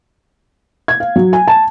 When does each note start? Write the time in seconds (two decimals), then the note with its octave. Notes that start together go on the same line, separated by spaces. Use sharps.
0.88 G#6
1.00 F5
1.16 F#3
1.33 G#5
1.48 A5